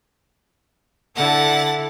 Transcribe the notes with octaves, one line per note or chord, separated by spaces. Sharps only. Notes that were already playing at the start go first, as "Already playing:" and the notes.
D3 E4 A4 F#5 A6